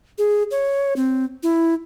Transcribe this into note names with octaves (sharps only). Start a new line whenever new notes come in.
G#4
C#5
C4
E4